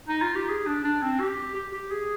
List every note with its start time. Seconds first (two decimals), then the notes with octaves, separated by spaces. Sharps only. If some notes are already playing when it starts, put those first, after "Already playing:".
0.08 D#4
0.22 F4
0.36 G4
0.49 G#4
0.67 D4
0.85 D4
1.02 C4
1.20 G4
1.55 G4
1.73 G4
1.91 G#4